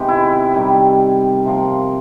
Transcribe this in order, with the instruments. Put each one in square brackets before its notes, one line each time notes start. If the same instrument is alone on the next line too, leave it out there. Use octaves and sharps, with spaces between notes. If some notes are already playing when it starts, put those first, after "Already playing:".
Already playing: [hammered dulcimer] C3 D#3 G#3 B3 G4
E4
C3 D#3 G3
C3 F3 A#3